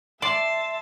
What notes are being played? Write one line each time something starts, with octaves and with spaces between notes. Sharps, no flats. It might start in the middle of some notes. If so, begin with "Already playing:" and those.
D5 E5 A5 C6